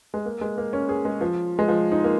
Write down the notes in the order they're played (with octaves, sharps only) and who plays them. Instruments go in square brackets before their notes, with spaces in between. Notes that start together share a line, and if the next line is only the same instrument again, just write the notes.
[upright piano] G#3
A#3
G#3
A#3
C#4
G#4
G#3
F3
G#3
F3
D#4
A#3